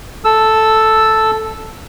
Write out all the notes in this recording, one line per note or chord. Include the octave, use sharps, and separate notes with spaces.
A4 E6